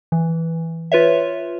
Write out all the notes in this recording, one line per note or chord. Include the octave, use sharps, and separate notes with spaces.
E3
F4 B4 C#5 E5